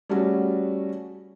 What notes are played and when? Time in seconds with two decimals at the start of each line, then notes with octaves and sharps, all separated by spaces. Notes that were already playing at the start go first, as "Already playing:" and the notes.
0.09 G3 A3 C#4 F#4 G#4